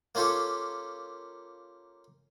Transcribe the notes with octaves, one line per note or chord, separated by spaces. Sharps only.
A#3 C#4 F4 G4 A4